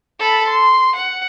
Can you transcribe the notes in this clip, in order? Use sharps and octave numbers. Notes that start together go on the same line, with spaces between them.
A4 B5
C6
F#5